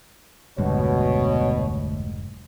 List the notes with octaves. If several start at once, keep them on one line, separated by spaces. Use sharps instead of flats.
F1 D2 G#2 B2 G3 C#5